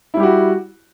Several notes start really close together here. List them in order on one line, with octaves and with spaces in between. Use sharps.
E4 G3 G4 F#4